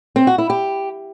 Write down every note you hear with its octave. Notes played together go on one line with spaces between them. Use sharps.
C4
F#4
E4
G4